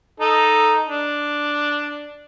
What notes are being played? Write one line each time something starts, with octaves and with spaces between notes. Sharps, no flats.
D#4 A4
D4